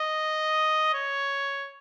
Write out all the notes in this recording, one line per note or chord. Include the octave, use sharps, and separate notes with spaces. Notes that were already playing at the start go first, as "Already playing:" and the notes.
Already playing: D#5
C#5